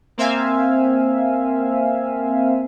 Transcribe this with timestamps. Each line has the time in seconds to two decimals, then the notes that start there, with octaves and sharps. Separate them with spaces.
0.18 A#3 C4 E5 F5 G#5